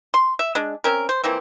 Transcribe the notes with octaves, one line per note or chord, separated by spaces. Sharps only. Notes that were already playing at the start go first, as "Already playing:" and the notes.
C6
E5
G#3 D4
C4 C#4 A#4
C5
E3 F3 A#3 C4